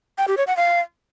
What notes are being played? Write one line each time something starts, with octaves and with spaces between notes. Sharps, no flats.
G5
G4
C#5
F#5
F5